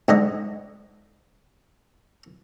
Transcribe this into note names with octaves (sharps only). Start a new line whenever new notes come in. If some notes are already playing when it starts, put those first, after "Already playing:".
G#2 D3 D#5